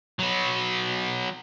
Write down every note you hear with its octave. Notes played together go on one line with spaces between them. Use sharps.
F#3 B3